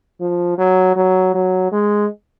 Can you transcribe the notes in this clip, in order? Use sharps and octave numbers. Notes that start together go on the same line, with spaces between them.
F3
F#3
F#3
F#3
G#3